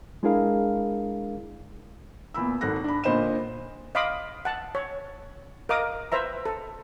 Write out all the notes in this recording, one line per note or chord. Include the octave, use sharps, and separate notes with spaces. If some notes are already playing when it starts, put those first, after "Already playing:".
G#3 D4 E4 G#4 A#4 F5
E2 A#2 B5 E6
G#1 G#2 A4 F#6 A#6
D4 B5
A#2 D3 C5 D#5 B5 E7
D#5 F5 B5 C6 D6 D#6
F#5 A5
C#5
A#4 D#5 F5 D6 D#6
B4 C5 E5 A#5
A4